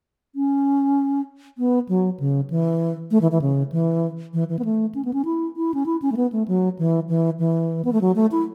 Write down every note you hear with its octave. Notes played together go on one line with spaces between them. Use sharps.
C#4
B3
F#3
C#3
E3
A3
E3
E3
C#3
E3
E3
E3
B3
A3
C#4
B3
C#4
E4
E4
C#4
E4
C#4
A3
B3
A3
F#3
E3
E3
E3
B3
A3
F#3
A3
E4